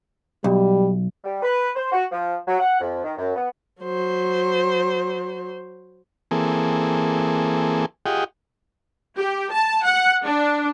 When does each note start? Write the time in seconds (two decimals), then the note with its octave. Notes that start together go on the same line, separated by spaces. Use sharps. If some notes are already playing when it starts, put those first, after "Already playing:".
0.44 B1 G3
1.24 G3
1.43 B4
1.75 C5
1.92 F#4
2.11 F3
2.48 F#3
2.60 F#5
2.80 F2
3.04 D#3
3.17 F#2
3.36 B3
3.82 F#3 C5
6.31 E3 A#3 C4 G#4 A4
8.06 F4 G4 G#4 D#5 F#5 G5
9.17 G4
9.51 A5
9.84 F#5
10.24 D4